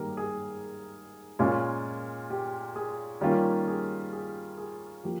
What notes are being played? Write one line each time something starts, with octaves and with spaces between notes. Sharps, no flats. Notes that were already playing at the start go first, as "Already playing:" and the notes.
Already playing: G#2 D#3 G3 A#3 G4 G#4 A#4
G#4
A#2 G#3 C#4 F4
G4
G#4
D#3 G3 A#3 C#4 F4 G4
G#4
G#4
G#4
F3 A#3 G4